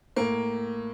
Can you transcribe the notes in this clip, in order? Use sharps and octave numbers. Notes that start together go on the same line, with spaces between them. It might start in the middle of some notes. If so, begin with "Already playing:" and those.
A2 A#3